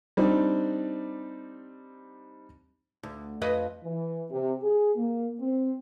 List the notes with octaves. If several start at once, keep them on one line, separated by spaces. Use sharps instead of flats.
G3 C4 D4 D#4
D2
F2 B4 D#5
E3
C3
G#4
A#3
C4